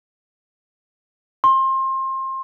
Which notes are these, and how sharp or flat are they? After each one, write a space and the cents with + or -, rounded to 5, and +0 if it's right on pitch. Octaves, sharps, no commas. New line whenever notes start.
C6 +25